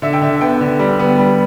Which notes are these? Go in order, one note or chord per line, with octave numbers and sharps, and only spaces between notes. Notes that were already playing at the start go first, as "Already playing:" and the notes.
D3 E5
G5
D3 E5
B3 G5
D3
G3
B3
G3